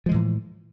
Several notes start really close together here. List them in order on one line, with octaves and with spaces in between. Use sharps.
F3 G#3 E3 A2